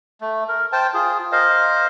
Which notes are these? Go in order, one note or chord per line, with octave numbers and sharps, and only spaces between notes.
A3
A#4
C5 G5 A5
F4 G#4
A#4 C5 D#5 F5